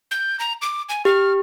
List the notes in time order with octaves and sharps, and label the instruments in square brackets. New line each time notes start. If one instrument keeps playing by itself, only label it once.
[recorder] G6
A#5
D6
G#5
[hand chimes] G4 [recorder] F6